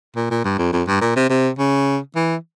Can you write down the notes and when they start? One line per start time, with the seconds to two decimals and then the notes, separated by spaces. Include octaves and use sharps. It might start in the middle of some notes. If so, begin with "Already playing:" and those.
0.16 A#2
0.31 A#2
0.44 G2
0.58 F2
0.73 F2
0.88 G2
1.01 A#2
1.16 C3
1.30 C3
1.59 C#3
2.16 E3